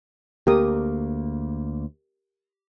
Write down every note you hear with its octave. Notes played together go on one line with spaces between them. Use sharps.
D2 A#3 G4 A#4 D#6